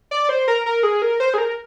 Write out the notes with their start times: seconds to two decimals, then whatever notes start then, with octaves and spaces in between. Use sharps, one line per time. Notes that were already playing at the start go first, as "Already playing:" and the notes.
0.11 D5
0.29 C5
0.48 A#4
0.66 A#4
0.83 G#4
1.02 A#4
1.20 C5
1.34 G#4
1.38 A#4